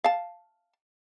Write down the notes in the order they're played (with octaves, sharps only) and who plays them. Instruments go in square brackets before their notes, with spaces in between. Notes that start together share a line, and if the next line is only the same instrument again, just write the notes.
[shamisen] F5 A5